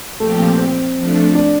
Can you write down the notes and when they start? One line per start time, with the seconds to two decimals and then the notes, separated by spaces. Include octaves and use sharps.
0.20 A#2 F3 A3 C4 G4
0.58 C4
0.96 F3 A3 D4
1.35 D4